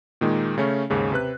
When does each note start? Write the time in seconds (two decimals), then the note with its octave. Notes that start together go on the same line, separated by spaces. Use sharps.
0.21 A#2 D#3 G#3 A#3
0.58 C#3 A3 C#4
0.90 D#2 G#2 C#3 C#4
1.12 C3 B4 F#6